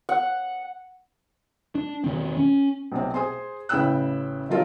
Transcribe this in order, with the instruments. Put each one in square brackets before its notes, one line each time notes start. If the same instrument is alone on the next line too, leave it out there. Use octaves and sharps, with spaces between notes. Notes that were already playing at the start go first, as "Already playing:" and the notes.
[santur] F#5
[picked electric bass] D4
E1 D#3 C4
C#4
[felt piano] B1 C3 C4
G#4 C5 G#5 C6
A1 C#3 E4 G5 E6 F#6
B2 D#3 F#3 F4 A4 A#4